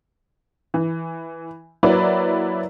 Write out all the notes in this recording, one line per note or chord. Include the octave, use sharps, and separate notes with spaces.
E3
F#3 A#3 E4 B4 D5